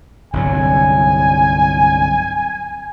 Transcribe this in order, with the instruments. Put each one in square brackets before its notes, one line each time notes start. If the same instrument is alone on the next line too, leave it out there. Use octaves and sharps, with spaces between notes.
[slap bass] G1 C2 F#3 [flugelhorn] G#5